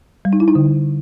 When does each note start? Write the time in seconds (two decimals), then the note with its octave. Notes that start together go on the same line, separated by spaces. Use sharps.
0.25 G3
0.33 D#4
0.40 E4
0.48 D#4
0.55 D3